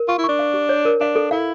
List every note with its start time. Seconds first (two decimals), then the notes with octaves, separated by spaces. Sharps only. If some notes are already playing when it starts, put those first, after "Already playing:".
Already playing: A#4
0.08 F4 C#6
0.18 E4
0.24 D4 C#6
0.39 F5
0.54 G4
0.69 C#5
0.85 A#4
1.00 D4 F5
1.16 A4
1.31 E4 F5